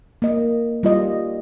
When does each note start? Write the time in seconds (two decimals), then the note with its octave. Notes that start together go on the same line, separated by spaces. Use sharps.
0.22 A#3 D#5
0.83 G3 F4 D#5